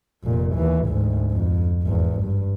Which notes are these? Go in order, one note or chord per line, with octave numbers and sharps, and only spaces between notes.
F1 A#2
D#2 E3
D2 G#2
F2
G#1 E2
G2